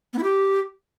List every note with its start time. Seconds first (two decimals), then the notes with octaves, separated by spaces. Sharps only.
0.13 B3
0.18 E4
0.23 G4